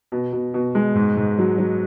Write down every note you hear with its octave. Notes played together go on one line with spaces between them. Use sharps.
B2
B2
B2
G#3
G#2
G#2
F#3
F#3